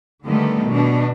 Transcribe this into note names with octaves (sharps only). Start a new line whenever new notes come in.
D3 D#3 G3 A3 B3
B2 D4